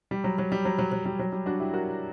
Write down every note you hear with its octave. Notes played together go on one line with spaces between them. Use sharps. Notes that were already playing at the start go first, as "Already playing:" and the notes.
G3
F#3
F#3
G3
F#3
F#3
F#3
G3
F#3
G3
D4 F#4
E4 G4
F#4 A#4